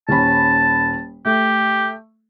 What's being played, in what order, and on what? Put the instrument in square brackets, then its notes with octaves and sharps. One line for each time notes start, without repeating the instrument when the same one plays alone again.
[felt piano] D#1 C#4 B5 [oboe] A5
[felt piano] A3 [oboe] G4